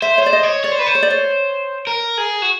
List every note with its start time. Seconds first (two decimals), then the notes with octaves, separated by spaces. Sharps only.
0.02 C5 E5
0.18 C#5
0.23 C5 D5
0.33 D#5
0.43 C#5
0.64 C#5 D5
0.72 C5
0.79 B4
0.87 C5
0.95 C#5
1.03 D5
1.10 C#5
1.87 A#4
2.18 G#4
2.42 F#4